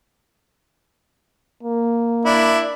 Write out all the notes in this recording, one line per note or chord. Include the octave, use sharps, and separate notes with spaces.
A#3
D4 E4